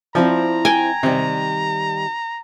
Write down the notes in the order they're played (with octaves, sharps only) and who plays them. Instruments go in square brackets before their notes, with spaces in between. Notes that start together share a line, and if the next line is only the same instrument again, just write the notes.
[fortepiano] F3 [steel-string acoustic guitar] C4 E4 D5 [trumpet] A#5
[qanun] G5 G#5
[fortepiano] C3 [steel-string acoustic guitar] D#3 G3